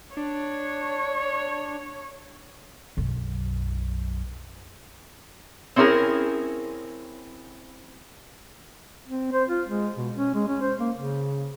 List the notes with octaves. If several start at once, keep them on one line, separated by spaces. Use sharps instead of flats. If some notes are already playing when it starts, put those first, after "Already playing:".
D4 C#5
B1 F#2
C4 C#4 E4 G#4 A#4
C4
C5
F4
G#3
B2
C#4
G#3
C#4
C5
A#3
C#3